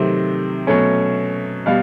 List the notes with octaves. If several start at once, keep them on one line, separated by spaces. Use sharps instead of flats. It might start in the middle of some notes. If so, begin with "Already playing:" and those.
Already playing: C3 D#3 F#3 A3 C4
B2 F#3 A3 C#4
B2 G3 F5